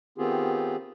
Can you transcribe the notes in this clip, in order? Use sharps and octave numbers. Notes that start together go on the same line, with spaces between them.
D#3 B3 C4 F4 G4 G#4